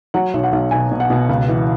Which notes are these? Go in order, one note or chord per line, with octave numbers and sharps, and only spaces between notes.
F#3 F#5
B1
F#5
B1
B2 G#5
B2
F#5
B2
C#2
E3